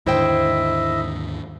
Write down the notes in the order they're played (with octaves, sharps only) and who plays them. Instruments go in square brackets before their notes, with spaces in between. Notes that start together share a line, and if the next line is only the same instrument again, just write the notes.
[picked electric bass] D#2 G#2 D3 [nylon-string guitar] E4 C5 G5 [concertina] D#5 E5